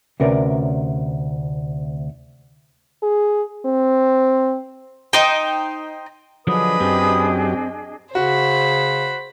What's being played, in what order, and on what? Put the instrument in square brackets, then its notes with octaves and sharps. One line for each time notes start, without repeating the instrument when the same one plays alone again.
[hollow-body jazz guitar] D2 C3 C#4 A#4 B4 D5
[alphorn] G#4
C4
[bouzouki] D#4 C5 G5
[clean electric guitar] D3 F3 F#3 [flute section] D4 G#4 D#5 [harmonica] B4 D#6
[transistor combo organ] F#2 G4 [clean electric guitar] C4
[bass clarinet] C#3 [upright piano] F#4 [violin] C5 B5